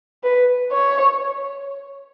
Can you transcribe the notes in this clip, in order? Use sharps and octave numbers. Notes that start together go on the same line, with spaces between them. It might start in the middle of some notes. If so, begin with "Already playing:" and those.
B4
C#5